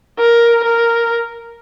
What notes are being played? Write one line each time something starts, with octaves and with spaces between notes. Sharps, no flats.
A#4
A#4